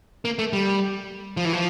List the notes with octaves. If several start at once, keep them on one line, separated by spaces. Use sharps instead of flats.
A#3
A3
G3
F3
E3
F3